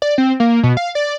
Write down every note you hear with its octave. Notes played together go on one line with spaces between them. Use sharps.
D5
C4
A#3
B2
F5
D5